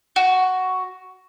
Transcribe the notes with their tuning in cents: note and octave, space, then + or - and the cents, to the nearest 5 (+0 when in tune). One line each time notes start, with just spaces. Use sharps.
F#4 +5